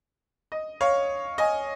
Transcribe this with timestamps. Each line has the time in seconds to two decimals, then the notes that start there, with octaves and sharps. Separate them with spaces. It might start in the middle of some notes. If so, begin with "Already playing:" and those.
0.52 D#5
0.81 C#5 F5
1.38 D#5 G#5